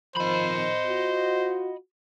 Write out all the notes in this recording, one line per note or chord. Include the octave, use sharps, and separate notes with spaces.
D#3 F3 C5 D#5 B5
F4 F#4